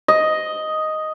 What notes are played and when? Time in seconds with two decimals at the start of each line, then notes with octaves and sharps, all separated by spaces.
0.08 D#5